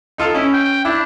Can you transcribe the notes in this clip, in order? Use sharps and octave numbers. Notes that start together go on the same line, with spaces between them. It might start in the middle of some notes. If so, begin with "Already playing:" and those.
D#4 F4 A4
C#4 E4
G5
D4 E4